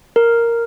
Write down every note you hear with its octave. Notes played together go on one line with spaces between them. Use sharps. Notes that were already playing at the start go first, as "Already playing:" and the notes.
A#4